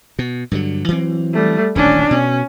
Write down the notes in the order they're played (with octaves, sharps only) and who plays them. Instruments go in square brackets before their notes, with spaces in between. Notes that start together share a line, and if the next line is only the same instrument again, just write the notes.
[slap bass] B2
G2 D3 F#3
E3 F#3 C4
[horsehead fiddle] G3 A3
[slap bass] D#1 A1 D#3 [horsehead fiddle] C#4 D4
[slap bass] B2 [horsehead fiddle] C#4